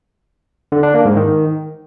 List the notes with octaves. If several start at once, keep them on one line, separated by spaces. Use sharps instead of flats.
D3
D4
A#3
G#2
D#3